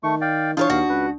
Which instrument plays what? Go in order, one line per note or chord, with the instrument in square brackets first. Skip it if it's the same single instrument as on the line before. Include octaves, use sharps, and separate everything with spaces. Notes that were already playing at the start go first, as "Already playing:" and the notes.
[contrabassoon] D#3 [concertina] A3 C#6
[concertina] D5 F5 G5
[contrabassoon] E3 [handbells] D4 [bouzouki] F4 A#4 C#5 [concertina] F5
[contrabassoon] D#2 [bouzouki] F#4
[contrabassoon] C#2 [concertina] B4